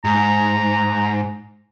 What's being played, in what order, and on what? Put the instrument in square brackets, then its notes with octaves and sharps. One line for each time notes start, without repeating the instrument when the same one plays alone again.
[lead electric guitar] G#2 [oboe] A#5